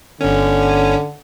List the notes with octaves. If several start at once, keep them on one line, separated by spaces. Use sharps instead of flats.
G1 D3 C#4